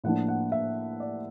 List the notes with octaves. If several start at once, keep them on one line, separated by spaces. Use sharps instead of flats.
A2 F3 A#3 D4 F#5
F#5
E5
D5